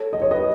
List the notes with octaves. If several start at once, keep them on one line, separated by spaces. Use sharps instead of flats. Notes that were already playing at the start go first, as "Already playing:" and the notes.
Already playing: A4 C#5
D#5
C#5
B4 D#5